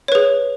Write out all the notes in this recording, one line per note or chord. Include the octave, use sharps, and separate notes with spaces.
G#4 B4 C#5